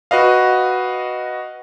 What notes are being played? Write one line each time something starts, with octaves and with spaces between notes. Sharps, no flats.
F#4 B4 D#5 F5